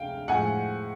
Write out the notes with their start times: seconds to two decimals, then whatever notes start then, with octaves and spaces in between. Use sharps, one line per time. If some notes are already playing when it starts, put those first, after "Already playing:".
Already playing: D2 C3 G#3 F5 G5
0.28 A2 F3 G#3 F#5 G#5